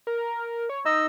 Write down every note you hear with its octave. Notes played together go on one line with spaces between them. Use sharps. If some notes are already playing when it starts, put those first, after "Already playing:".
A#4
C#5
D#4 D#5 E6